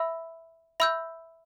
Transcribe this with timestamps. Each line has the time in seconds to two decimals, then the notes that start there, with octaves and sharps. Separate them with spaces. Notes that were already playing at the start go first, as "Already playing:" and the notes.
Already playing: E5 B5 E6
0.80 E5 B5 E6 G6